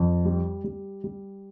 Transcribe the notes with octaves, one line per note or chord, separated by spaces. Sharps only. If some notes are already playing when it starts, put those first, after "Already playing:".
Already playing: F2
G3
G3
G3